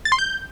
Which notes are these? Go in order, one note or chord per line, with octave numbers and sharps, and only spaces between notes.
A6
C6
G6